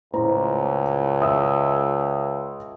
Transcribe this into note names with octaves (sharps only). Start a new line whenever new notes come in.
C#2 A2 C5 A#5
E5 D#6 E6